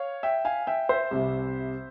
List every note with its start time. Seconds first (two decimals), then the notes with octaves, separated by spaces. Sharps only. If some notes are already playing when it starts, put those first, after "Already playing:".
Already playing: C#5 F5
0.23 E5 G5
0.45 F5 G#5
0.67 E5 G5
0.89 C5 E5
1.11 C2 C3 G3